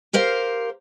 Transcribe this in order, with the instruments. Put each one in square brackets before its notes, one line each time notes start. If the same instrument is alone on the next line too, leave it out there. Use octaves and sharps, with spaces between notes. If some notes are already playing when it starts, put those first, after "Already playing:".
[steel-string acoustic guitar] G4 A#4 C5 F5